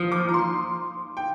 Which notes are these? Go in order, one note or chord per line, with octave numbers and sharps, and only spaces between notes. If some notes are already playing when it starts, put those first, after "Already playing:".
Already playing: F3 D#6 F6
D6
A#5
C6
G5